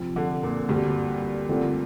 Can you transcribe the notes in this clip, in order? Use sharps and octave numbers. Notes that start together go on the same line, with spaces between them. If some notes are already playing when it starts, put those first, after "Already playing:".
Already playing: C3 F3 C4
D3
A#2
D2 G2 D3 G3 C4
D3 A3 C4 F4